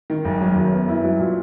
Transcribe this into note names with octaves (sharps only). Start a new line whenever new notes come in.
D#3
F#1
F#2
F#1
B3
E4
F#3
A#2